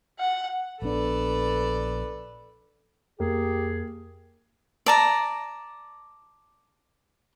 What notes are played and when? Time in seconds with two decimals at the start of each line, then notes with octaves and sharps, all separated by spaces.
0.19 F#5
0.82 A#1 B3 D4 A4 B4 D5
3.20 F2 A#3 G4 G#4
4.86 D5 A5 A#5